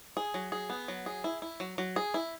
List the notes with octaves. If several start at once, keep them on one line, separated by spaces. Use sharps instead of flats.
G#4
F#3
G#4
B3
F#3
G#4
E4
E4
F#3
F#3
G#4
E4